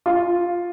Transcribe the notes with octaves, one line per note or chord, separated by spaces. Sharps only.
F4